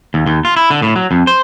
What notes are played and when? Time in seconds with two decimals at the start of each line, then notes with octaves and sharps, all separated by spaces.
0.14 D#2
0.26 D#2
0.45 F4
0.57 E4
0.70 D3
0.82 A2
0.96 F#3
1.11 F2
1.27 C5